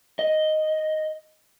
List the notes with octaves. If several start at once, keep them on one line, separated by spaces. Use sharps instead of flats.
D#5